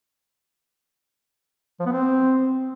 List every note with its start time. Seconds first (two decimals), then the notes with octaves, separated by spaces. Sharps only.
1.80 F3
1.86 B3
1.92 C4